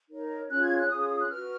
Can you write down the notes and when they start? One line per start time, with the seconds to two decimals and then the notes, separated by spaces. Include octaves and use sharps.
0.09 D#4 A#4 C#5
0.49 C#4 F4 G#4 C#5 F#6
0.62 G#6
0.76 F#6
0.89 C#4 F4 G#4 C#5 D#6
0.99 D#6
1.09 D#6
1.19 F#6
1.29 F#4 B4 F6